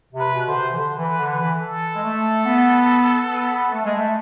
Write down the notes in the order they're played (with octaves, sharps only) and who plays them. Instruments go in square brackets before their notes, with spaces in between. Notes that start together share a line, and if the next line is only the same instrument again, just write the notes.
[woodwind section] C3
[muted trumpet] B4
[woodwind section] B2
[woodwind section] D3 [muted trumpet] C5
[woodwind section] C3
E3
D3
E3
[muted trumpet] B4
[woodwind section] D3
[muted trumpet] B4
[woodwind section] E3
[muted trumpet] A4
[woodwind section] G#3
A3
B3
B3
A3
G#3
A3